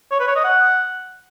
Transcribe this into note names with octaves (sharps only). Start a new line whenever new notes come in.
C#5
B4
C#5
D#5
F#5